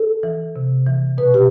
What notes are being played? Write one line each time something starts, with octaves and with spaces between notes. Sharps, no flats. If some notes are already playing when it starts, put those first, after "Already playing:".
Already playing: A4
E3
C3
E3
B2 B4
G4